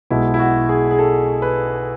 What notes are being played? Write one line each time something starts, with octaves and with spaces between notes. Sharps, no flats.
B1 B2 G#3 B3 E4
E4
F#4
G#4
G#4
A4
B4